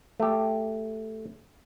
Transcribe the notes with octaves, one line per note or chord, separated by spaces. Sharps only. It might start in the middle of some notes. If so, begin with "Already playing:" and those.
A3 G4